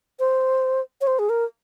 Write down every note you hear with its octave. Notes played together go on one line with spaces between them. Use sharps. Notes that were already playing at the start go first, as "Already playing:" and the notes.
C5
C#5
C5
G#4
A#4